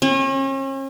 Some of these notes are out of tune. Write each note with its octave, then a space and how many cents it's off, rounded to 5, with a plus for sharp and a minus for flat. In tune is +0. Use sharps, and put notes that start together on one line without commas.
C#4 -40